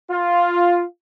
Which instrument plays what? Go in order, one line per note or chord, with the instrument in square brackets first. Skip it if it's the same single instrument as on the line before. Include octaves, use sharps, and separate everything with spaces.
[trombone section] F4